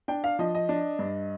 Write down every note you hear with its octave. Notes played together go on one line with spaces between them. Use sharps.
D4 G5
F5
F3 D#5
D#5
D4
G2